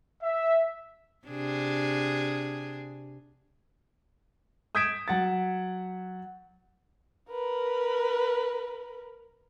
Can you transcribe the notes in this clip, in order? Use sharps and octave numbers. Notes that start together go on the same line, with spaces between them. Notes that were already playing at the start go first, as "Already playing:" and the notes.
E5
C3 D4 G#4
D#6 G6 G#6 B6 D7 E7
F#3 F#5 A6
A#4 B4